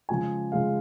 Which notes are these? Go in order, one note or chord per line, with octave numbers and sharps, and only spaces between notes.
C#3 F3 G#3 F4 G#5
C#3 F3 G#3 F4 F5